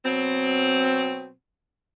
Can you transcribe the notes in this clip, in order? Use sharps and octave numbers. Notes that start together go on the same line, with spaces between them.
B2 F#3 C4